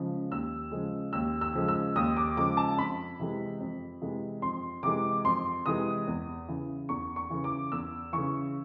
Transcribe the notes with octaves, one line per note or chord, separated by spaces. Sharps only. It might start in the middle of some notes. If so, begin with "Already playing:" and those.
Already playing: C#3 F3 G#3
D#2 E6
C#3 F3 G#3
D#2 E6
E6
C#3 F3 G#3
E6
D#2 D#6
D6
C#3 F3 G#3 D6
A5
F2 B5
C3 E3 G#3
F2
C3 E3 G#3
F2 C6
C3 E3 G#3 D6
F2 C6
C3 E3 G#3 D#6
E2
C#3 E3
E2 C#6
C#6
C#3 E3
D6
E2 E6
C#3 E3 C#6